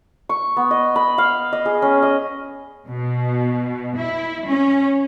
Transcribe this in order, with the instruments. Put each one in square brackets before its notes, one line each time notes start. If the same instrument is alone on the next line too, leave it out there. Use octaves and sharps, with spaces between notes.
[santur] C#6
B3
D#5
B5
F5
D#5
G#4
C#4
D#5
[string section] B2
E4
C#4